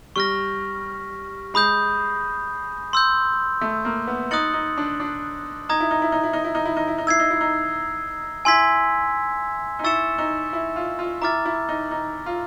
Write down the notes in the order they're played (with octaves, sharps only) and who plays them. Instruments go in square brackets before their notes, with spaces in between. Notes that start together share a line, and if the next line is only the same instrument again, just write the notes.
[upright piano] G3 [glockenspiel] C#6 F6 A#6
[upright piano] G#3 [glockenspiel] B5 D#6 G6
[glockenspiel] C6 E6 G6
[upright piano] A3
A#3
B3
[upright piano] D#4 [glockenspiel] D#6 F#6 A6 C#7 F#7
[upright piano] D#4
D4
D4
[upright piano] D#4 [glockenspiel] A#5 D#6 G#6
[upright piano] E4
D#4
E4
D#4
E4
D#4
E4
D#4
E4
D#4
E4
D#4
[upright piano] E4 [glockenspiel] E6 G#6 C7
[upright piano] D#4
E4
D#4
[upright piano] E4 [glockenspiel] G#5 C6 E6 G#6 B6
[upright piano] D#4
[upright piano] E4 [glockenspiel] C#6 E6 A6 C#7 E7
[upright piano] D#4
E4
F4
F4
[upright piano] E4 [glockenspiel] A#5 D6 F6 A6
[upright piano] E4
D#4
D#4
F4